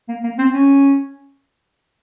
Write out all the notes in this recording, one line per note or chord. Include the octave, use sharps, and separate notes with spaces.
A#3
A#3
C4
C#4